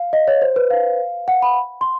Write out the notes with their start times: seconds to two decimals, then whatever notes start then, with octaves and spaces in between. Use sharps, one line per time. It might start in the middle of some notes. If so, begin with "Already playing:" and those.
Already playing: F5
0.13 D#5
0.28 C#5
0.42 C5
0.56 B4
0.70 F5
1.28 F#5
1.42 B5
1.81 C6